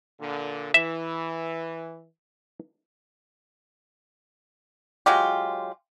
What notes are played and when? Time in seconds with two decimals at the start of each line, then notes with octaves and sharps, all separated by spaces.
0.20 A#2 D3
0.74 E3 E5
5.06 F#3 G#3 F4 G4